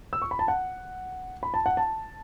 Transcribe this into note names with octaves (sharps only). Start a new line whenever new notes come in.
E6
C#6
B5
A5
F#5
B5
A5
F#5
A5